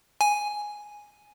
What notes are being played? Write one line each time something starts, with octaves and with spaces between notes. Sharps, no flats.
G#5